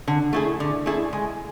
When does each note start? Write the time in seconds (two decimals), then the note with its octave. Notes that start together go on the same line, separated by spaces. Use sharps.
0.08 D3
0.33 A3 E4 G#4
0.60 D3
0.86 A3 E4 G#4
1.13 G#3